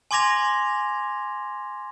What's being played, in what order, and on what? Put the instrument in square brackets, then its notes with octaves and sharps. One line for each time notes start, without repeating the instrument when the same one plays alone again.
[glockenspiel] G#5 C6 D6 G#6 A#6 F7